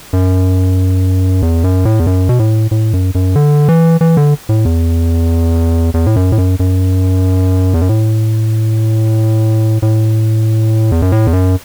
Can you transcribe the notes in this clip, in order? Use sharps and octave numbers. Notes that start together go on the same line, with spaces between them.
F#2
E2
F#2
A2
E2
F#2
B2
A2
A2
F#2
F#2
D3
E3
E3
D3
A2
E2
E2
A2
F#2
A2
F#2
F#2
E2
F#2
A2
A2
E2
F#2
A2
E2
F#2